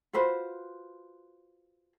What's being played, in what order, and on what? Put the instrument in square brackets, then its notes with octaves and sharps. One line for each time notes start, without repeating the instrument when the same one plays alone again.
[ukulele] F4 F#4 B4 C5